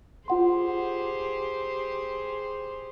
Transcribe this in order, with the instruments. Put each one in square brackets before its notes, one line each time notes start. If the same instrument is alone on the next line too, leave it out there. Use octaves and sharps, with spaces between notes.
[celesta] F4 F#5 C6 [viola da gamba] G4 G#4 C5